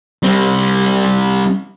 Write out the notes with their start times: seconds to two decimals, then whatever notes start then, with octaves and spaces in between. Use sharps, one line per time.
0.23 G3 C4